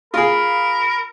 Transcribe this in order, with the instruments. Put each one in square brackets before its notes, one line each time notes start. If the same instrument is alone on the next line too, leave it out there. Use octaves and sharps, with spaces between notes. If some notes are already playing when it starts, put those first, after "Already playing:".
[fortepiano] F4 G#4 [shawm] A#4 [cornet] B5